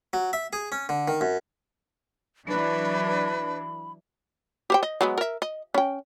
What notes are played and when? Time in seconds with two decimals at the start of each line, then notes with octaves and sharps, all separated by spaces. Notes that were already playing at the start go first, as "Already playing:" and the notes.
0.13 F#3
0.33 E5
0.53 G#4
0.72 C#4
0.89 D3
1.08 D#3
1.21 F#2
2.49 E3 F#3 D4 B4 B5
4.70 G4 C5 G5
4.83 D#5
5.01 F#3 G#3 B3
5.18 A#4 E5
5.42 D#5
5.74 C#4 G5